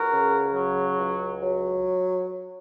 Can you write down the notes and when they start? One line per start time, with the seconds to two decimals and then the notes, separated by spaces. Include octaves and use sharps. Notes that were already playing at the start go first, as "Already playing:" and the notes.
Already playing: C#2 F#4 A#4
0.11 C#3
0.54 F#3
0.98 C#2
1.41 F#3